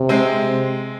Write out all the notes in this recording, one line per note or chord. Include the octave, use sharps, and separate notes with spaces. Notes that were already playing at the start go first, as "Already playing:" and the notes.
Already playing: C3
G#3 C4